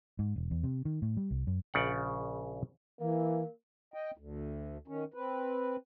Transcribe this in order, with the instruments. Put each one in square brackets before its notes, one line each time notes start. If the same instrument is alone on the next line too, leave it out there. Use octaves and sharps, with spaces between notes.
[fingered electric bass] G#2
E1
E2
C3
D#3
A2
G3
C2
F#2
[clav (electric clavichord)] A#1 C#3 D5 F#5
[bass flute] E3 [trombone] A#3
[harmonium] D#5 G5
D2
D#3 C#4
C4 B4